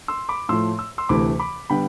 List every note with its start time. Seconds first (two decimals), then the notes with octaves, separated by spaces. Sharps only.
0.08 C6 E6
0.29 B5 D6
0.49 A2 F3 A3 C6 E6
0.79 E6
0.98 C6 E6
1.09 D2 C3 E3 A3 B5 D6
1.39 B5 D6
1.70 D3 G3 B3 G5 B5